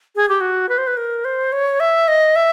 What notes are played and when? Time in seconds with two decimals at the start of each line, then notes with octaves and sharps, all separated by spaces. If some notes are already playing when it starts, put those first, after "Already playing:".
0.16 G#4
0.29 G4
0.41 F#4
0.69 B4
0.78 C5
0.87 B4
0.97 A#4
1.25 C5
1.52 C#5
1.80 E5
2.08 D#5
2.36 E5